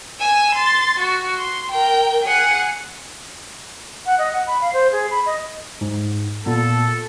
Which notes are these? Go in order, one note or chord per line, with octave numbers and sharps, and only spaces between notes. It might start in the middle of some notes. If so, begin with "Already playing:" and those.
G#5 E6
C6 A6
F#4
C6
A#4 G5
G#4 F#5
F#5
D#5
F#5
B5
F5
C5
G#4
B5
D#5
G#2
A#2 B3 A4